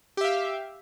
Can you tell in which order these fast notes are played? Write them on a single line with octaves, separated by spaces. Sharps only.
G4 E5 F5